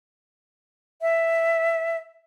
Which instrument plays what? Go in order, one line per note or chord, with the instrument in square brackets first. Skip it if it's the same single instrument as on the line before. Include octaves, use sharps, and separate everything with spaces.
[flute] E5